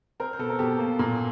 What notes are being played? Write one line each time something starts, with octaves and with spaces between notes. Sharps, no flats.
C4 A#4 C5
C5
B2 A4 B4
A#4
B2 G4 A4
A#3
A#2